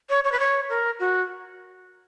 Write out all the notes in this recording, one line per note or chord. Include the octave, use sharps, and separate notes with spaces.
C#5
C#5
B4
C#5
A#4
F#4